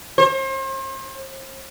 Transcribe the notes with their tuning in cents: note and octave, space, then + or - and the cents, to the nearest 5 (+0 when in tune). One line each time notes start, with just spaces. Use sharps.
C5 +40